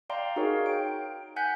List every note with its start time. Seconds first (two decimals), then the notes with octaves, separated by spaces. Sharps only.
0.10 D5 F5 G5 A#5 C6
0.36 D#4 F#4 G#4 A#4 C#5 F5
0.66 G5 D7
1.36 F#5 G#5 F#6 G6 B6